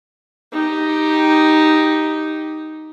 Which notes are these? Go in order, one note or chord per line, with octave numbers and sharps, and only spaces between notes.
D#4 G4